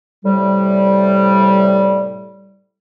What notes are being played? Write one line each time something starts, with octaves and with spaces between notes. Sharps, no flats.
A2 C3 G3